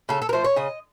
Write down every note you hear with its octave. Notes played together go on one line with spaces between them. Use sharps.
C#3 A4
A4
A#4
F3 A3 C5
C#5
C#3 D#5